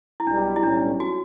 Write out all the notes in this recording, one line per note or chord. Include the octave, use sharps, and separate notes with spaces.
E4
B1 B2 G3 D4
E4
B1 A2 G3 C#4 D4
F#4